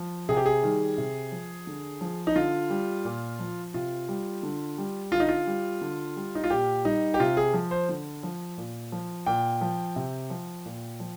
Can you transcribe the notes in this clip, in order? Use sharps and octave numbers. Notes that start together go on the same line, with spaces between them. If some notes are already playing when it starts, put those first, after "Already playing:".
Already playing: F3
C3 G#4
G4
G#4
D#3 G3
C3
F3
D3
F3
D#4
D3 F4
G3
A#2
F3
C3 F4
G3
D3
G3
D3 F4
D#4
F4
G3
D3
G3
D#4
F4
A#2 G4
G3 D#4
G4
C3 F4
G#4
F3
C5
D3
F3
A#2
F3
A#2 G5
F3
C3
F3
A#2
F3